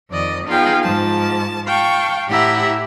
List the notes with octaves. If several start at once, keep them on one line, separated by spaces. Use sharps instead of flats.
F2 D#3 D5 D#5
B3 D#4 F4 G#4 F5 G5
G#2 F3 A5
F5 G5 A5 C#6
A2 E4 G4 E5 F#5 A#5